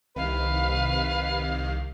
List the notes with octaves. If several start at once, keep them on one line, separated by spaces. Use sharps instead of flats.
C2 C3 D#3 B4 F5